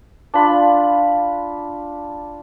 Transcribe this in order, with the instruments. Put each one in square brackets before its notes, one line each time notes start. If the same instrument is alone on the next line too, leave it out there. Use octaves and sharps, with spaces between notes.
[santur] D4 F4 B5